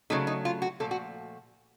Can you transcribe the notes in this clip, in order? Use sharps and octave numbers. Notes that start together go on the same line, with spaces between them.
C#3 F#3 A3 D#4
D#4
F4
F#4
A#2 F3 A3 A4
F#4